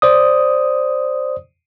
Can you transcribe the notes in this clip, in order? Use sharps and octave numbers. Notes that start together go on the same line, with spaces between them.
C5 D5 D#6